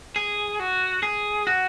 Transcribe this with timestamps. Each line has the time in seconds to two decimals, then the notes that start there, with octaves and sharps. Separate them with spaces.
0.16 G#4
0.60 F#4
1.03 G#4
1.47 F#4